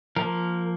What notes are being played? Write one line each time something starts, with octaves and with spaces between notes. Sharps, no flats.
F3 A#3 A#4